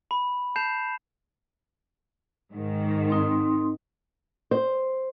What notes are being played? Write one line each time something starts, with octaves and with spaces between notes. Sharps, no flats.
B5
A5 G6 C7 E7 F7
G#2 D#3
C4 D#4 C6
C5